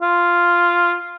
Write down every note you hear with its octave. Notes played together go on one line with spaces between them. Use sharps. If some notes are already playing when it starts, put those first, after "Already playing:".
F4